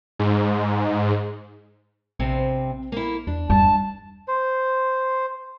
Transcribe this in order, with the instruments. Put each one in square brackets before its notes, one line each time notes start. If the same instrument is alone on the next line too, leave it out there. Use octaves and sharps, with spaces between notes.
[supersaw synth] G#2
[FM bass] A#1 [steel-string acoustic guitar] G2 C3 C4
[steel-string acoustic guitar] A#3 E4
[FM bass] E2 [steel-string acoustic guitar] D4
[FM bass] E2 [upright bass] G2 [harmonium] A5
[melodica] C5